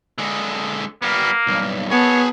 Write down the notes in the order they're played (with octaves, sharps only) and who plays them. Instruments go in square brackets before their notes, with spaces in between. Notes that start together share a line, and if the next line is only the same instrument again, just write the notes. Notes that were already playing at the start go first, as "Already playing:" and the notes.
[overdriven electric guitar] D3 G#3
[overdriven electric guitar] G3 B3 [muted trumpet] A#3
[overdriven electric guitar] B1 G2
[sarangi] B3 [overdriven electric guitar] G#4 A5 [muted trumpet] C#5